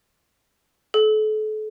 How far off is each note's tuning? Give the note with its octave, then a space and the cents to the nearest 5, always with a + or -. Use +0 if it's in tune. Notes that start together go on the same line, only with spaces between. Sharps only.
A4 -35